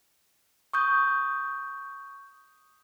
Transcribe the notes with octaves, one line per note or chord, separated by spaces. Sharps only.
C#6 D#6 G6